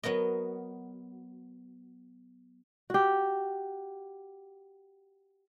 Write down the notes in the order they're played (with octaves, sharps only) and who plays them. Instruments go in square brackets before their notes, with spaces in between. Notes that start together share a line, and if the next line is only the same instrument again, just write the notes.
[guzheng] F#3 B3 A#4 D#5
[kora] F#4 G4